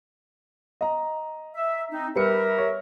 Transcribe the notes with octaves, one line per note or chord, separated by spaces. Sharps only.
D#5 A#5
E5
C4 D#4
G3 G4 A#4 B4 E5 C#7
C#5